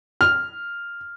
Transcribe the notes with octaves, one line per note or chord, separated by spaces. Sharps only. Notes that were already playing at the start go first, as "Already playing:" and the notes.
F6